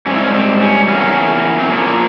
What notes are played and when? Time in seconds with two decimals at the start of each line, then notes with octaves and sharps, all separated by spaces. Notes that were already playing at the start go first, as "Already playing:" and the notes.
0.06 G#2 G3 C4 C#4
0.15 E4
0.23 C#4
0.34 C4
0.61 C#4
0.88 E2 E3 A#3 C#4
1.59 C4
1.70 A#2 F3 A#3 C#4